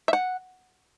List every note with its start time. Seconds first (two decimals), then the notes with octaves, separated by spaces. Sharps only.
0.08 E5
0.13 F#5